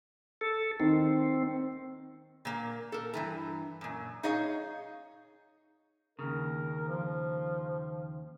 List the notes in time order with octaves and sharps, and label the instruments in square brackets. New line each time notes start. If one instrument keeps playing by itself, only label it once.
[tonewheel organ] A4
[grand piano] D#3 [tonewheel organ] C4
[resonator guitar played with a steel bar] A#2 A#3
A4 A#4
G2 E3 A#5
F#2 A#2
D#4 G#4 C#5 D#5 F5
[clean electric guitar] D#2 A2 C#3 [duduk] A#4
[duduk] F3